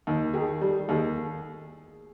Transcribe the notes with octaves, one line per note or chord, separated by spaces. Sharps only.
D#2
D#3 G#4
G3 A4
D#2 G#4